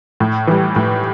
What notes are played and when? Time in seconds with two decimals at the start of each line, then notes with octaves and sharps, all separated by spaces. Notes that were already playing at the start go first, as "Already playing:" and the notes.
0.20 A2
0.47 E3 G3
0.76 A2